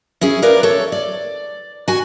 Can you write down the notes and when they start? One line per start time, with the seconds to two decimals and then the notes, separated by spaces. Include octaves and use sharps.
0.21 C#4 E4 G#4
0.42 A#4 B4 D5 F5
0.63 A4 C#5
0.92 D5
1.88 F#4 G#5